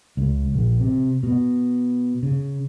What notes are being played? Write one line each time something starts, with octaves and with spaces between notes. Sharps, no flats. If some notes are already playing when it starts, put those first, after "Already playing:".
C#2
A#1
C3
B2
C#3